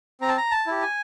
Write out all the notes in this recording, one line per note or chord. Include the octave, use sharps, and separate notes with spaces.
C4 A#5
A5
A#5
A5
E4 G4
G#5